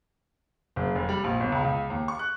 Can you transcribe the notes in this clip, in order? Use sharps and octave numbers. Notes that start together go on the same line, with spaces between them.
F#1
F1
G3
A#1
G1
C#2
C#2
D#2
C#6
F#6